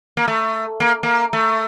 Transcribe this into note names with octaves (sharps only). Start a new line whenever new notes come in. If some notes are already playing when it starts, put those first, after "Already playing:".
A#3
A3
A#3
A#3
A3